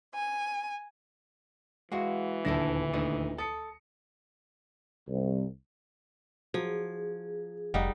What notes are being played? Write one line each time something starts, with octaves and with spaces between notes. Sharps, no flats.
G#5
E3 G#3 F#4 F5 F#5
D#1 D2 D4 E4 A4 A#6
A3 D4 D#4
A4 D#6 C#7
C2
F3 F#3 G#4
F1 G3 D#4 D#5 F5 F#5